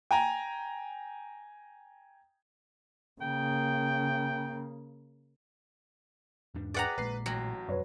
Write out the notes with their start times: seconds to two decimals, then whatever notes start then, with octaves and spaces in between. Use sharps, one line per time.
0.11 G5 G#5 A#5
3.21 C#3 A#3 G5
6.55 E2 G#2 D4
6.74 G#4 B4 D5 F#5 G5 A#5
6.98 A#1 A#2 G#3 B4 B6 C7
7.26 A1 F#3 G5 A#6
7.69 E1 F#2 B4 C#5